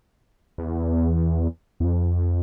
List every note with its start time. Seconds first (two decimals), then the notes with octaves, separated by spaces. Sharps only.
0.58 E2
1.80 E2
1.84 F2